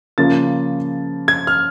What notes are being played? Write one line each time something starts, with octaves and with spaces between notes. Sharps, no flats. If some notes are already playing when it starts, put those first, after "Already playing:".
C#3 F3 A#3 A6
G#6
F6